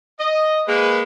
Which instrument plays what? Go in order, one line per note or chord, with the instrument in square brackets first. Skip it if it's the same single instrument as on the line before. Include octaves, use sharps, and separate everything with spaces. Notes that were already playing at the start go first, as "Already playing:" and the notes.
[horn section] D#5
G#3 A#3 B4